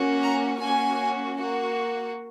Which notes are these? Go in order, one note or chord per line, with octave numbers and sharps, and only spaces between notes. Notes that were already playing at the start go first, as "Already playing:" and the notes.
Already playing: A#3 C#4 F#4
A#5
A#3 C#4 F#4 G#5
A#3 F#4